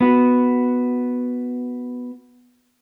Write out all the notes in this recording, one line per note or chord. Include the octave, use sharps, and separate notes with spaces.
B3 F#4